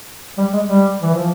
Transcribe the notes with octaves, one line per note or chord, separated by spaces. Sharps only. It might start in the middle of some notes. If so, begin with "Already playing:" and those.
G3
G#3
G3
E3
F3